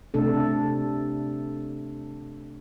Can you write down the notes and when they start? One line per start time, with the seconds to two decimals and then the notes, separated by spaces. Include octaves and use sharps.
0.14 C3 A3 D4 A4